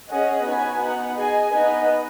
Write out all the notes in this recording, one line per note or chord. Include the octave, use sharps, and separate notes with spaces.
C#4 G#4 D#5 F#5
B3 D#4 F#4 B4 G#5
B3 D#4 B4 F#5
G#4 D#5 G#5
B3 D#4 B4 D#5